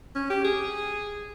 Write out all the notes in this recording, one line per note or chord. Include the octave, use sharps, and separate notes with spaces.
C#4
G4
G#4